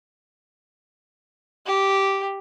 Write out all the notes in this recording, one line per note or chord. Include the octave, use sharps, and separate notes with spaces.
G4